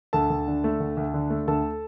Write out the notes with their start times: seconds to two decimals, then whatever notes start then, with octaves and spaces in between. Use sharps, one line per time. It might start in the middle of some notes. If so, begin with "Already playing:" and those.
0.13 D2 A4 A5
0.30 D2
0.48 D3
0.64 A3
0.80 D2
0.97 D2
1.14 D3
1.30 A3
1.48 D2 A4 A5